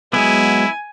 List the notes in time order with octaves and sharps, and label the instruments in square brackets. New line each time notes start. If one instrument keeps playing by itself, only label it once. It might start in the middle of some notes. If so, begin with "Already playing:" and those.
[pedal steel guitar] F#3 G#3 B3 [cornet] E4 [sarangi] G#5